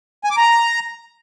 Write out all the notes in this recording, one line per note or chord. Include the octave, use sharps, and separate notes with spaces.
G#5
D6
A#5